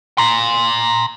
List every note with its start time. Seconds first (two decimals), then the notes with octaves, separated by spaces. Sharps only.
0.18 A#5 C6